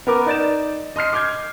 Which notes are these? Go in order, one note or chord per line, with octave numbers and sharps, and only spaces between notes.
B3 A#4 D6
D#4 D5 A6 E7
D#5 C6 F6 C7
D6 F6 G6 G#6